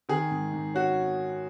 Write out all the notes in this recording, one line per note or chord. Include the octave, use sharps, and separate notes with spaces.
D#3 G#4
G#2
G#2
C#4 F#4